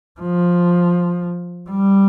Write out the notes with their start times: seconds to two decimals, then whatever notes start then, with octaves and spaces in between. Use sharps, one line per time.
0.21 F3
1.70 G3